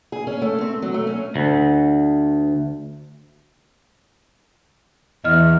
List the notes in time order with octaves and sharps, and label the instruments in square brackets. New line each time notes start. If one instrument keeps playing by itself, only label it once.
[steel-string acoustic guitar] G#4
C#4
A3
C4
F#3
A3
C#4
[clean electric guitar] D2
[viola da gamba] E2 [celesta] D#5 F6